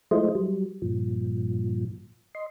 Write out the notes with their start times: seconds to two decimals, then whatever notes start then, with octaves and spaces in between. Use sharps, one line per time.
0.11 F3 G#3 A3 E4 C5 D#5
0.35 F#3 G3
0.82 G2 A#2 F3
2.35 D#5 C6